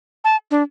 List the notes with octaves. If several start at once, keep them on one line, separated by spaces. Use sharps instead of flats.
A5
D4